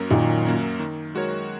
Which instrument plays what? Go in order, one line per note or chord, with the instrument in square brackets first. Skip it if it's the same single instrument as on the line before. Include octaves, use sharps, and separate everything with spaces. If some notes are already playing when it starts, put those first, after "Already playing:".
Already playing: [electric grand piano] F#2 F#3 A#3 C#4 A#4
[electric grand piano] F#2 [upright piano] A#2 D#3
[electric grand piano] F#3 A#3 C#4 A#4
D#3
G#3 F#4 A#4 C#5